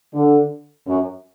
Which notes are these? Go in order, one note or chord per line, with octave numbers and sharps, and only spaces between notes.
D3
F#2